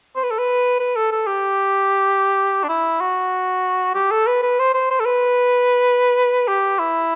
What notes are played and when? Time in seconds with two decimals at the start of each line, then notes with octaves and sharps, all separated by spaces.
0.16 C5
0.23 B4
0.31 A4
0.38 B4
0.79 B4
0.96 A4
1.11 A4
1.27 G4
2.64 D4
2.68 E4
3.01 F#4
3.95 G4
4.11 A4
4.27 B4
4.42 B4
4.59 C5
4.74 C5
4.90 C5
5.00 A4
5.05 B4
6.48 G4
6.79 E4